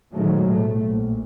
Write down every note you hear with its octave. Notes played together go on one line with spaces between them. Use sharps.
A#2 D#3 F3 F#3 G#3 A3
B1 A2 A3
A#1